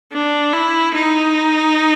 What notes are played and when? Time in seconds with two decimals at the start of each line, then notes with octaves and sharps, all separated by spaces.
0.13 D4
0.53 E4
0.95 D#4